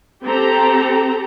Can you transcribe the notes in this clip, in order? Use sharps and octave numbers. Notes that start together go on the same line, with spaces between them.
C4 G4 A4 A#5